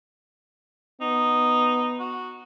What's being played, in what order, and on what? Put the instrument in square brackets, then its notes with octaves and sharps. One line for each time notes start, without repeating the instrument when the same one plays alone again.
[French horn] B3 [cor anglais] D#4
[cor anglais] F#4